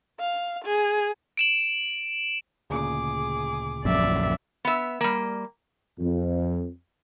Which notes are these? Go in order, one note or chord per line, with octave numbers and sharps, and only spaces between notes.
F5
G#4
D7 E7 F#7
D2 A#2 C#3 G#4 D6
A#1 F#2 D5 E5
B3 E5
G3 A#3
F2